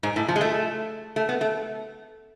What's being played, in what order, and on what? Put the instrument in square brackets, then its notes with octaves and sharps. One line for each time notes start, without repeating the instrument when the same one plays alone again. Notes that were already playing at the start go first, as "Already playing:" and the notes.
[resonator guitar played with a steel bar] G#2
A2
F3
G#3
A3
A3
B3
A3